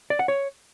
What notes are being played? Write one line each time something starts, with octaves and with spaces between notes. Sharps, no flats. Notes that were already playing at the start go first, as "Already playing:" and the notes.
D5
F#5
C#5